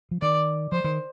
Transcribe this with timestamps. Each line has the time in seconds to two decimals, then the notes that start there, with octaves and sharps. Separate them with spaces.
0.11 F3
0.22 D#3 D5
0.72 F3 C5
0.84 D#3